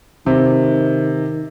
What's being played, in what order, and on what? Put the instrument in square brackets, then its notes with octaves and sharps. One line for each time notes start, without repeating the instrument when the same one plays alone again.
[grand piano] C3 [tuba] D#3